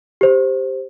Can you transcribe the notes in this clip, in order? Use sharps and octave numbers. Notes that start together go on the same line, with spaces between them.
G4 C5